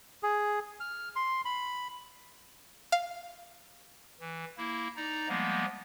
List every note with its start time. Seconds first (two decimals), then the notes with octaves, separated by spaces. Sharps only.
0.23 G#4
0.80 F6
1.16 C6
1.45 B5
2.92 F5
4.20 E3
4.58 A#3 E4
4.97 D#4 D5 A#5
5.28 F3 G3 G#3 A#3 B3